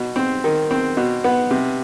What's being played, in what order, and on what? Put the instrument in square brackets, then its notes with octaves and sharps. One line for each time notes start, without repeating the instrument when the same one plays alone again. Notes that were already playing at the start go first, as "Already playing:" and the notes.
Already playing: [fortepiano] B2
C4
D#3
C4
B2
B3
C3